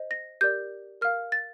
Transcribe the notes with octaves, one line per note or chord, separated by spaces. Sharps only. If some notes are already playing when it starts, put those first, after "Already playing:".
Already playing: C5 D#5
A#6
G4 A#4 D5 G6
A#4 F5 F6
A6